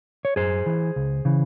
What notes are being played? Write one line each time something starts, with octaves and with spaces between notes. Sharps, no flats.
C#5
F#2 G#4 C5
E3
C#2
C#3 E3